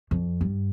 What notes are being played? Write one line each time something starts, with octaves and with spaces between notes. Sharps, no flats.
F2
G2